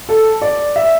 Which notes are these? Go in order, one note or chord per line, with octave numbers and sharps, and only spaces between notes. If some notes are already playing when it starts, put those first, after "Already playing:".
A4
D5
E5